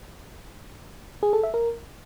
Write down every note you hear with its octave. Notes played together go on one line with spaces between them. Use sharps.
G#4
A4
E5
A#4